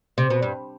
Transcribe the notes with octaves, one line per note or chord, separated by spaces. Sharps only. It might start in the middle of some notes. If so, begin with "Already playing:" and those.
C3
B2
G2